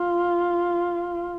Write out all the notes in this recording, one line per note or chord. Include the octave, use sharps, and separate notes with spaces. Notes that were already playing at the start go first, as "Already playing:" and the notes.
Already playing: F4